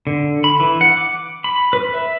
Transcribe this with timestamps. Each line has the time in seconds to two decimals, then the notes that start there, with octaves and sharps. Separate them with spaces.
0.07 D3
0.44 B5
0.60 E3
0.81 F#5
0.97 D6
1.44 B5
1.73 B4
1.94 E5